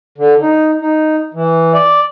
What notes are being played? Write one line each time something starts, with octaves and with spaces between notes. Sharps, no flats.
D3
D#4
D#4
E3
D5